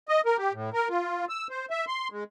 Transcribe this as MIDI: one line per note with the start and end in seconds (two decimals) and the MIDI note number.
0.09 0.21 75
0.26 0.37 70
0.38 0.53 67
0.53 0.70 45
0.73 0.88 70
0.89 1.25 65
1.29 1.47 88
1.50 1.66 72
1.71 1.85 76
1.88 2.08 84
2.12 2.24 56